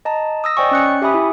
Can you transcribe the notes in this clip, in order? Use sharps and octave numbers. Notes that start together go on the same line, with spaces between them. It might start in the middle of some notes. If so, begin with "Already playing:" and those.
D#5 A5 A#5
D#6 E6 A#6
C5 D5 D#5 G5 G#5 C#6
C#4 F#6 C#7
G4 E5 G#5 B5 D#6
E4